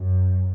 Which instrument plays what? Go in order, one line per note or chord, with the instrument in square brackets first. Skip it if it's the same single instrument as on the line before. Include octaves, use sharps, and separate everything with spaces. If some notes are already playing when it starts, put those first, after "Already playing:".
Already playing: [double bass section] F#2